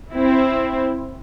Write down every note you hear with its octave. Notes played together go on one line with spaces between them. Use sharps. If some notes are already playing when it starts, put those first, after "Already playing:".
C4 E4